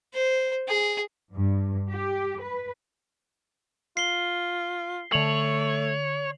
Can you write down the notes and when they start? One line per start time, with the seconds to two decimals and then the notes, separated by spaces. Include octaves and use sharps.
0.14 C5
0.68 G#4
1.32 G2
1.91 G4
2.42 B4
3.97 F4 C7 G7
5.12 D3 A3 C#5 F7 F#7